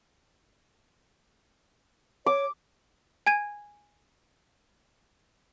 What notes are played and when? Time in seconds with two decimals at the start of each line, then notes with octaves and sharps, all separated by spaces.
2.26 C#5 D6
3.27 G#5 G#6 D#7